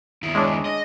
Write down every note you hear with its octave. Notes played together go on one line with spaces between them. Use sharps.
D#2 E4
G#3 C#4 D4
D#5